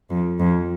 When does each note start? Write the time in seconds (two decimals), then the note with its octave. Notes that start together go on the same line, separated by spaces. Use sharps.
0.10 F2
0.39 F2